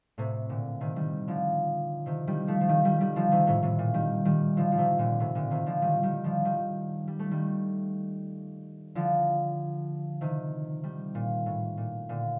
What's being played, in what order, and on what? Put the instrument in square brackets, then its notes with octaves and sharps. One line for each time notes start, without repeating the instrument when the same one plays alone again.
[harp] A2 C3
A#2 D3
C3 D#3
D#3 G3
D3 F3
C3 D#3
D#3 G3
F3 A3
F3
D#3 G3
D#3 G3
D#3 G3
D3 F3
C3 D#3
A2 C3
A2 C3
A#2
D#3 G3
D#3 G3
D3 F3
F3
C3 D#3
A#2 D3
A2 C3
A#2 D3
C3 D#3
D3 F3
D#3 G3
D#3 G3
D3 F3
D#3 G3
G3
A3
D#3 G3
D3 F3
C3 D#3
D#3 G3
A#2
A2
A#2
A#2 D3